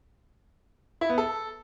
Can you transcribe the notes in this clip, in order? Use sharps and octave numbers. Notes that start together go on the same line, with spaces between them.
E4
B3
A4